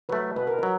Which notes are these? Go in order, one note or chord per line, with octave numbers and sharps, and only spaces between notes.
F#3 A3 B4
B2 B4
A#4
B4
F#3